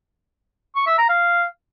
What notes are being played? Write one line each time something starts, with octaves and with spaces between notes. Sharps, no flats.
C#6
E5
A#5
F5